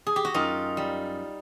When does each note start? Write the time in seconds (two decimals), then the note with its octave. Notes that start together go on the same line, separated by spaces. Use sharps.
0.07 G#4
0.16 G4
0.25 F#4
0.34 F#2 D#4 F4
0.77 G3